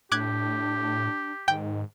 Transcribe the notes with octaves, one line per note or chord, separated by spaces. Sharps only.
A2 D4 G4 D6 F#6 G#6
G#2 D#3 G5